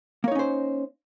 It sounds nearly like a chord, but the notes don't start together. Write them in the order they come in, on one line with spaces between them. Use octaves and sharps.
A#3 C#5 D#4 C#4 C5